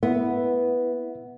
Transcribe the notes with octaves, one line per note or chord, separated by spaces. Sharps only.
B3 E4 E5 F#5